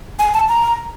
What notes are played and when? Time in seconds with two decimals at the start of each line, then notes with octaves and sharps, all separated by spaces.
0.19 G#5
0.34 A5
0.49 A#5